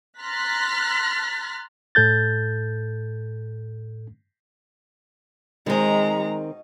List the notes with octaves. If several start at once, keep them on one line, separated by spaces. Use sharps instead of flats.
A#5 C6 F6 F#6 A6 B6
A2 A4 G6 A6
B2 D#3 G#3 C4 D#4 D#5 A#5